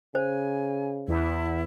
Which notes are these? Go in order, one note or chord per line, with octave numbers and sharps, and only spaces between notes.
C#3 C5 G#5
E2 E4